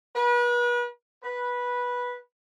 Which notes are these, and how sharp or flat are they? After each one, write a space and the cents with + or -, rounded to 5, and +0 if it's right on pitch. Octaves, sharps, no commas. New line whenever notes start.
B4 -35
B4 -10